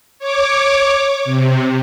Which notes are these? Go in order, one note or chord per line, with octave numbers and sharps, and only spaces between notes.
C#5 D6
C3